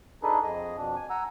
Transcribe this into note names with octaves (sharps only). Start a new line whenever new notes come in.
D4 D#4 G#4 A4 B4
F2 G#4 D#5
F2 B2 D4
G#5
F#5 G#5 A#5 E6